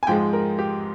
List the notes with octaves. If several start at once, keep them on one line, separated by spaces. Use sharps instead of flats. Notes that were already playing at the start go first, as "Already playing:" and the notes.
G#5
G#2 F3 G#3 G5
A#4
G4